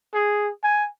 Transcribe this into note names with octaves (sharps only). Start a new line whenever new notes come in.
G#4
G#5